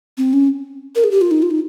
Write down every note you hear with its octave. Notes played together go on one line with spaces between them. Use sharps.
C4
C#4
A#4
G#4
G4
F4
D#4
F4
D#4